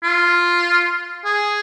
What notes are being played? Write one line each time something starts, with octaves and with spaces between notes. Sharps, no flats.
F4
G#4